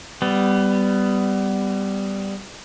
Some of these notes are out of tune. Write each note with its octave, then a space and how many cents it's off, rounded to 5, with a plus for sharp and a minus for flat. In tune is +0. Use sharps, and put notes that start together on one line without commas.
G3 +0 B3 +20